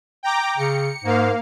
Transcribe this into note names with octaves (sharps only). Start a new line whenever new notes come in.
G5 A#5 D6
C#3 C#7
G#2 A#3 F5